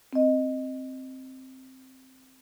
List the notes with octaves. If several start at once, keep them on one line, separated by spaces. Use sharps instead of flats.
C4 D#5